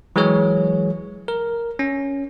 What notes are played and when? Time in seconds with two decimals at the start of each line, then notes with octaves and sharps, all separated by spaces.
0.16 E3 F#3 G#3 G#4 C#5
1.28 A#4
1.79 C#4